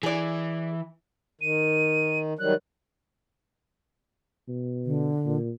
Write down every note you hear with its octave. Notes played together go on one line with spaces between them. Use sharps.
E3 G#4 D5
D#3 D#7
D#3 F#3 G3 F#6
B2
D3
A#2